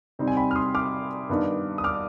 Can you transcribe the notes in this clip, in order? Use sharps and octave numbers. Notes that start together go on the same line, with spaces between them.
C3 G3 C4 D#4
G#5
G5 B5
F6
C6 D#6
D6 F6
G2 D#3 B3 D#4
D#6
D6 F6